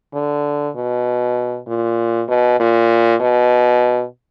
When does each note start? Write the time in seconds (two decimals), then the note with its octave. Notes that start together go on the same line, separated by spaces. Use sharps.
0.14 D3
0.75 B2
1.67 A#2
2.28 B2
2.60 A#2
3.21 B2